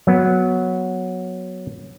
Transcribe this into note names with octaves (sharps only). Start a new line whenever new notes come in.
F#3 B3